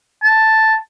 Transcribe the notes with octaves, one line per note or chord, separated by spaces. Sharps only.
A5